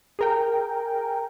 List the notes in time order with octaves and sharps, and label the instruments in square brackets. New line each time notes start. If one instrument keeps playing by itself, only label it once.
[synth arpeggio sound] G#4 A#4 G5